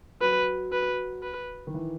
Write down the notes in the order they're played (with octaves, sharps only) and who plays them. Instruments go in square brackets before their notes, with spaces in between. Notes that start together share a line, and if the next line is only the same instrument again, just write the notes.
[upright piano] F#3 [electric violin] B4
[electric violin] B4
B4
[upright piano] D#3
E3